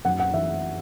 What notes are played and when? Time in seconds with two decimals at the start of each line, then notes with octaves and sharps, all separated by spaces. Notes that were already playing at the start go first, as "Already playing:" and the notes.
0.05 F#2 F#5
0.20 F#5
0.34 E3 E5